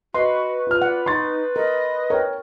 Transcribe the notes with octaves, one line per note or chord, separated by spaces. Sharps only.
F#4 B4 D#5 C6
F4 F6
D5 F#5
D#4 C6 C#6 A6
A#4 D#5
A#4 C#5 G5